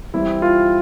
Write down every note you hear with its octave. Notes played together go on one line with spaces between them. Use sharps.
E3 G3 C4 E4
F4